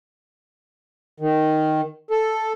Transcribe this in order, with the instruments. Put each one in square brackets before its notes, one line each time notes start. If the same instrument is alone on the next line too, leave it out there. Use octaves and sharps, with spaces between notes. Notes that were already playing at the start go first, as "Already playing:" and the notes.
[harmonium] D#3
A4